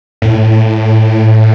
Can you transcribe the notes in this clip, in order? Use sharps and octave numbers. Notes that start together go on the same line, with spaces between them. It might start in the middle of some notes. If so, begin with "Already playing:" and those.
A2